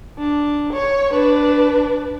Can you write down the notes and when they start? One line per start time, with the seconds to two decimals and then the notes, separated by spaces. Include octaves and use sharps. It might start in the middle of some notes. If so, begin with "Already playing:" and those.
0.18 D4
0.73 C#5
1.12 D4 B4